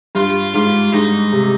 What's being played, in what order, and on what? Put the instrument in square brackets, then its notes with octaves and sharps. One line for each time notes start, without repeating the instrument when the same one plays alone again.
[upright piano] G2 [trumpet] F4
[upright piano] G#2 [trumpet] F4
[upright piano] G#2 [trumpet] D#4
[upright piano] C3